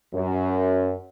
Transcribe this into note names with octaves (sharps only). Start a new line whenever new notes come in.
F#2